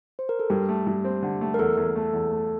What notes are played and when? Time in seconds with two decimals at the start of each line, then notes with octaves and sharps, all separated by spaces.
0.19 C5
0.29 A#4
0.39 A4
0.50 G2 G4
0.69 A3
0.87 G2
1.04 C4
1.23 D3
1.41 A3
1.54 A#4
1.59 E2 A4
1.77 E2
1.96 A3
2.13 E2
2.31 A3